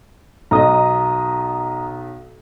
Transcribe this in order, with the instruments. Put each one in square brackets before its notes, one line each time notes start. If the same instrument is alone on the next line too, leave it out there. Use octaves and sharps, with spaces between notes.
[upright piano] B1 D#5 [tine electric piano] A#5 D#6